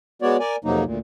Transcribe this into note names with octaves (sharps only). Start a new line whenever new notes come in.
G#3 B3 F#4 C#5 D5
A#4 D5 G#5
F2 C3 F#3 A#3 D#4
D2 A#2